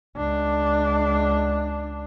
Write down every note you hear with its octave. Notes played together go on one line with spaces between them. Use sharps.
C#2 D4